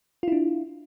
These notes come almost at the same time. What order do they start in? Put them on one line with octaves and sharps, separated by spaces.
F4 E4 D4